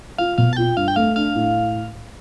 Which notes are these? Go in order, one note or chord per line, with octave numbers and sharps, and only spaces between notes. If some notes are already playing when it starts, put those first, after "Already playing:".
F4 F5
B2 F5
A5
F4 G5
G2 F5
G5
A3 F5
D4 F5
A2